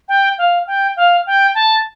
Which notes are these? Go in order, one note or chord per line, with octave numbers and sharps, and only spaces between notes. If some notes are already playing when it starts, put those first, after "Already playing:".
G5
F5
G5
F5
G5
A5